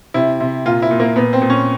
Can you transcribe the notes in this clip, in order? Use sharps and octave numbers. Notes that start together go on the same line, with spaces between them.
C3 E4
C3
A#2 F4
E4
A#2
A#3
A#2 B3
C4
A#2
C#4